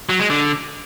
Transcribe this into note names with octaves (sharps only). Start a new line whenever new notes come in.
F#3
G#3
D3